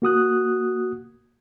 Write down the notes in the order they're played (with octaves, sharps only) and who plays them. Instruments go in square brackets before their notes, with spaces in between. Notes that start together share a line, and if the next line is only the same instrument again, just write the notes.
[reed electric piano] A#3 F#4 D#6 F#6